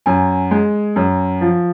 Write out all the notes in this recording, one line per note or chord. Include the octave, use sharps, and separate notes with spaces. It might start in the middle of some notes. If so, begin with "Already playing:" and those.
F#2 G#5
G#3
F#2
F3